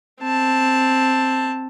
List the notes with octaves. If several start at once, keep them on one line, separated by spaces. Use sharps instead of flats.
C4 A5